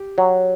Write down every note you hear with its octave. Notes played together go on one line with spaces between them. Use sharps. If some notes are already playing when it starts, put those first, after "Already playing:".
Already playing: G4
F#3